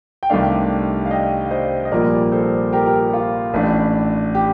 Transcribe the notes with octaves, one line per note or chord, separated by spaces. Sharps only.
G5
C2 C3 D#3 A3 D4 D5 F5
F5
D#5 G5
F5
C5 D#5
D#5
A#1 A#2 G3 A#3 A#4 D5
A4 C5
G4 A#4
G4 A#4
G4
F4
A1 A2 A3 D4
G4